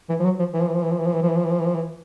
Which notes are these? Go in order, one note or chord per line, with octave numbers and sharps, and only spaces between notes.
E3
F3
F#3
F3
E3
F3
E3
F3
E3
F3
E3
F3
E3
F3
E3
F3
E3
F3
E3
F3
E3